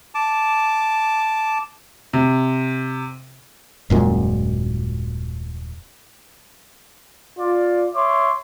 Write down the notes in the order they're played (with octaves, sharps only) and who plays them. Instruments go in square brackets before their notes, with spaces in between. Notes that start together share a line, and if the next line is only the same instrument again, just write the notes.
[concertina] A5 D6
[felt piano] C3
[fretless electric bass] D#1 F#2 A#2 G#3
[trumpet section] F4 D5
C#5 E5 C6 D6